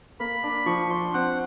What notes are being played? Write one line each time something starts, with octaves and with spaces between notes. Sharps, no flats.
A#3 B5
D4
F3 C#6
D4 C6
C4 F#5